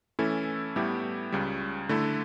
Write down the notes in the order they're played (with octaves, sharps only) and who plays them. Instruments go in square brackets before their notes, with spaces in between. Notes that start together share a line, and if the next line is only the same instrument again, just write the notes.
[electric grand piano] E3 A3 C#4 E4 A4
A2 G3 B3 E4 G4
C#2 C#3 G3
D3 A3 E4 A4